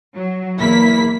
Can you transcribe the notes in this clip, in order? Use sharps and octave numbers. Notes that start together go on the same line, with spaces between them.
F#3
E2 A#3 E4 B6